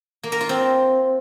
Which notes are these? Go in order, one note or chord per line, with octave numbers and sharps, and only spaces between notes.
A#3
A#4
F4
C4